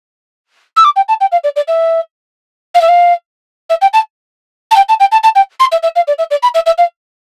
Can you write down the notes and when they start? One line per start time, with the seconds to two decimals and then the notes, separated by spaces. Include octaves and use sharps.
0.77 E6
0.84 D6
0.96 G5
1.09 A5
1.21 G5
1.32 F5
1.44 D5
1.56 D5
1.68 E5
2.75 F5
2.81 E5
2.88 F5
3.70 E5
3.82 G5
3.93 A5
4.71 A5
4.76 G5
4.89 A5
5.00 G5
5.12 A5
5.24 A5
5.36 G5
5.60 C6
5.72 E5
5.83 E5
5.96 F5
6.08 D5
6.19 E5
6.31 D5
6.43 B5
6.55 E5
6.66 E5
6.78 F5